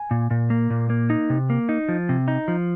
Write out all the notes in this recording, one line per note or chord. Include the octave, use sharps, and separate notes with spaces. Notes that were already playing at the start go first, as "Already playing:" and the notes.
Already playing: G#5
A#2
A#2
A#3
A#2
A#3
D#4
C3
A#3
D#4
F3
C3
D#4
F3